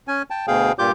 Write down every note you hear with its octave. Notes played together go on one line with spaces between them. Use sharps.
C#4 G#5
G5 A5
D2 B2 G#4 F5 G5
G2 A#2 F4 G4 D6 G6